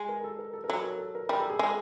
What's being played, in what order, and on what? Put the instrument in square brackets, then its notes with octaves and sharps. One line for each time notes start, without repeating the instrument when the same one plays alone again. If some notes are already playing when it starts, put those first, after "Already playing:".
Already playing: [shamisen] G#3
[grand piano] A#4
A4
A#4
A4
A#4
[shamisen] F#3 [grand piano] A4
[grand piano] A#4
A4
A#4
[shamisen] G3 [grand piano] A#4
[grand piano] A4
G#4
[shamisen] G#3 [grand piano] A4